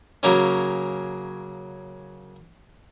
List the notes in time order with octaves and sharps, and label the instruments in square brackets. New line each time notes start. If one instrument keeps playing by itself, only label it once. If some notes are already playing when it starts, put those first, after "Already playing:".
[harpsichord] C#3 F#3 A#3 C#4